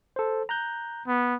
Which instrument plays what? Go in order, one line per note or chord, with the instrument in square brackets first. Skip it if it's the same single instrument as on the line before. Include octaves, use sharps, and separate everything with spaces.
[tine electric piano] A4 C5
A#5 F#6 G6
[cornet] B3